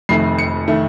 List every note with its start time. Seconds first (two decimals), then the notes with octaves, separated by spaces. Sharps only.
0.09 F1 F2 D#3 A3 C7
0.38 C#7
0.68 D#3 A3